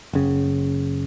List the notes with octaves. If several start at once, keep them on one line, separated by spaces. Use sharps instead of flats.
F#1 C#3